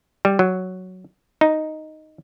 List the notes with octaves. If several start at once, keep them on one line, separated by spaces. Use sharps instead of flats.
G3
F#3
D#4